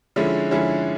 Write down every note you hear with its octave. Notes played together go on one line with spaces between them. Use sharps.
D3 F3 G#3 C#4 E4
D3 F3 G#3 C#4 E4